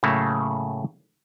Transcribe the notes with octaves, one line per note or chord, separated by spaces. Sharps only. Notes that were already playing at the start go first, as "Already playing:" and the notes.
A2 C#3 F#3 A3 A#3